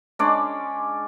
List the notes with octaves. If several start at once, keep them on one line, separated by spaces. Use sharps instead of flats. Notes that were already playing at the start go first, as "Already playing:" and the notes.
G#3 C#4 D4 D6